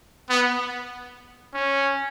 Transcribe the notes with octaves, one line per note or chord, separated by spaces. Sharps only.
B3
C#4